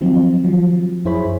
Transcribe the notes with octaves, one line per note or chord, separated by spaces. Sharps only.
D#3 F3 F#3 C4
F3 F#3
F#2 E4 G#4 C5 C#5 B5